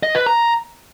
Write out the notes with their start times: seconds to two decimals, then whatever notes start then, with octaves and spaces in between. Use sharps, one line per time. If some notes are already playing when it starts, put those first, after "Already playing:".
0.03 D#5
0.15 B4
0.27 A#5